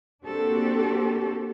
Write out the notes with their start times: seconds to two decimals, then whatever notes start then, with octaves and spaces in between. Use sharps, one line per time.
0.24 A#3 C4 D4 F#4 G4 A4